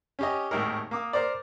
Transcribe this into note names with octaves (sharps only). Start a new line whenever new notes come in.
C#4 G4 D#5
G#1 D#2 A2 D#4 E4 A#4
A#3 D6 D#6
A#4 C5 D5